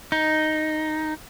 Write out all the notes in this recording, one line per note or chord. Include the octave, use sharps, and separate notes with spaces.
D#4